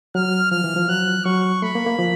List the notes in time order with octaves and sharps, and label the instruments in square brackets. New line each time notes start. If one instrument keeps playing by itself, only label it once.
[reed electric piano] F#3 [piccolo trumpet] F6
[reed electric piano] F3 [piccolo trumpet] F6
[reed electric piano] E3
F3
[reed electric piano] F#3 [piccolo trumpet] F#6
[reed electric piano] F#3 [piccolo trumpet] C#6
[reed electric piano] A3 [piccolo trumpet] B5
[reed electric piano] A#3
A#3
F3